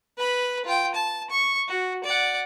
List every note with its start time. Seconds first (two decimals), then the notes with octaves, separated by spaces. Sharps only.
0.17 B4 B5
0.65 F4 G5
0.95 A5
1.30 C#6
1.68 F#4
2.04 D5 F#5